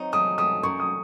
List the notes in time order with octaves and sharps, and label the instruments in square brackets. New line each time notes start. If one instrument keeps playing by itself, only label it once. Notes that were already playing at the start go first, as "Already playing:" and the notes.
Already playing: [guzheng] F#3 C4 D#4
[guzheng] A3 [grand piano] D#6
[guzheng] A3 [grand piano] D#6
[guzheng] F#2 [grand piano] C#6
[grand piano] D#6